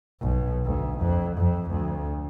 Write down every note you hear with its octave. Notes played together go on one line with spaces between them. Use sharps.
B1
D2
F2
F2
D2